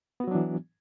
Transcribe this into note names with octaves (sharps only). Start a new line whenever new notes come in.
E3 F#3 B3 D4 F#4